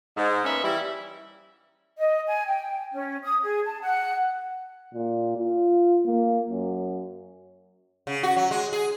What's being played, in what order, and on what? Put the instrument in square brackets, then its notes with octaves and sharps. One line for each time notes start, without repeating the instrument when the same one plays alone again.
[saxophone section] G#2
A#3 B3 C#4 B4 E5
E3 F3 G3 E4
[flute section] D#5
G#5
G5
C#4
D#6
G#4
A5
F#5
[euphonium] A#2
F4
A#3
F#2
[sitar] C#3
F#4
F#3
G#3
G#4